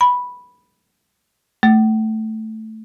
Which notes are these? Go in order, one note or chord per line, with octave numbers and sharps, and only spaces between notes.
B5
A3